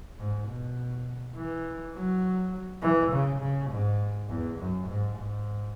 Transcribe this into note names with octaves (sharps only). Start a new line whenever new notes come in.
G#2
B2
E3
F#3
E3
C#3
C#3
G#2
E2
F#2
G#2
G#2